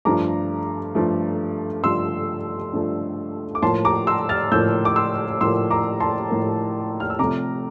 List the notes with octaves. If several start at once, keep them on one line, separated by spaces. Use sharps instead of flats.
G2 F3 A3 A#5 D6
G2 F3 A3
G2 F3 A3 C6 E6
G2 F3 A3
D6
A2 F3 A#3 A5 C6
A#5 D6
C6 E6
F6 A6
A2 F3 A#3 E6 G6
D6
C6 E6
A2 F3 A#3 C6 E6
A#5 D6
A5 C6
A2 F3 A#3
F6
E6
C3 F3 A3 A#5 D6